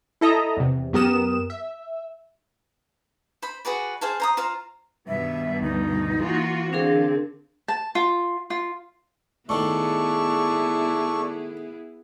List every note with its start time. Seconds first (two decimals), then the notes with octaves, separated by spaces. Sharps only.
0.21 E4 A4 D#5 E5 A#5
0.57 E2 C3
0.93 F#2 B3 G4 A#4 D#6 E7
1.50 E5
3.42 C5 B5
3.65 F#4 G#4 B4 D5
4.01 G#4 C5 F5 A5
4.20 C5 A#5 D#6
4.37 F4 C5 F5 A#5
5.08 G2 B2 D#3 E5
5.62 D2 D#4
6.20 E3 A#3 F4 F#4
6.73 D3 C4 D4 G#4 A#4 F5
7.68 A5
7.95 F4
8.50 F4
9.49 A2 D#3 B3 E4 G#4 A4 D5 C#6